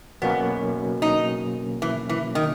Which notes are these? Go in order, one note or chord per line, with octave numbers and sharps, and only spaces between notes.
B2 F#3 A#3 B3 C#4 F#4
D#4
E3
E3
D#3